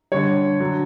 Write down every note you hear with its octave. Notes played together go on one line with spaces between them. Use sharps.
D3 G3 C#5
D3 F#3